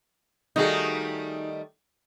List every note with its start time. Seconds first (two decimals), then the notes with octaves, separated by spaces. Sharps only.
0.56 D#3 G3 A3 D#4 F#4 G#4